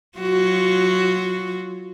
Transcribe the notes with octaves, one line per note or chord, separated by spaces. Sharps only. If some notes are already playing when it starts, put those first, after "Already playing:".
F#3 F4 F#4